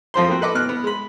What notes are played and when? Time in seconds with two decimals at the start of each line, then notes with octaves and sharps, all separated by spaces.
0.14 F2 F3 C5 C6
0.27 A#3 C4 F#4
0.41 A4 B4 D#5 D6
0.55 B2 F6 F#6
0.69 B3
0.84 G#3 B5